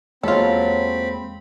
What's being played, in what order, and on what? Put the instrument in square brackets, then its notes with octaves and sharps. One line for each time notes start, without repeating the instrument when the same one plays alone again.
[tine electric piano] E2 G#3 A#3 [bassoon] F#3 [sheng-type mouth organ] C4 B5 [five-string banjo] F4 A4